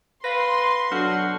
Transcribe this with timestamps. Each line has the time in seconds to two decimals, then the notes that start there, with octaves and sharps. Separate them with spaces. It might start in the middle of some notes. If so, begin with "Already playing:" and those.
0.24 B4 F5 C6 A#6
0.92 B2 F#3 D4 F#4 A4 F6 C#7